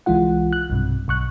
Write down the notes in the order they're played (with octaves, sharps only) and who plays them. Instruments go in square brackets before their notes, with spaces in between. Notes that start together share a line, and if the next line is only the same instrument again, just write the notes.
[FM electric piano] C2 E3 G#3 F4 F#5
F#6
B1 G2 C3
B1 C#6 F#6